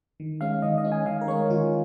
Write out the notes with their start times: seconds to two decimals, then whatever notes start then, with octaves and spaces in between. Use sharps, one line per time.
0.20 D#3
0.41 G#3 C#4 F5
0.62 D#3 D#5
0.78 D#5
0.85 G#3 C#4
0.92 G#5
1.06 D#3 F5
1.21 A#4
1.28 G#3 C#4 C#5
1.50 D#3 F4